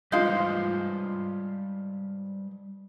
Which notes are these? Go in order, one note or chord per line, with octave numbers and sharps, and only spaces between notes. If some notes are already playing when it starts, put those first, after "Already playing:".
G3 G#3 F4 B4 C5 F5 G6